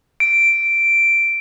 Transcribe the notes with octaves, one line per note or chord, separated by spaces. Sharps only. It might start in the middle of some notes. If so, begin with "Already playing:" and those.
D7